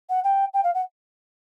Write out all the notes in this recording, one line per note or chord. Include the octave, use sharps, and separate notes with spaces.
F#5
G5
G5
F5
F#5